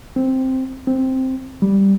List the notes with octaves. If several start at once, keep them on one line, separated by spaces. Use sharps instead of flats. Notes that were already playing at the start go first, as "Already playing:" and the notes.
C4
C4
G3